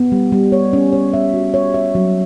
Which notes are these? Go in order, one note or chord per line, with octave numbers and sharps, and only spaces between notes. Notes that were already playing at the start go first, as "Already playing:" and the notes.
Already playing: B3
G3
G3
C#5
C#4
C#5
E5
F#4
C#5
E5
F#3